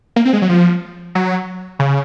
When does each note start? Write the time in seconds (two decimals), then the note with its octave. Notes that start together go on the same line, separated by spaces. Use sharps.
0.16 A#3
0.25 C4
0.33 G#3
0.42 F#3
0.49 F3
1.15 F#3
1.79 C#3